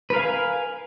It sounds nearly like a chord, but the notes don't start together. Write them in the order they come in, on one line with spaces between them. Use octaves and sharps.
B4 A#4 F5 G#5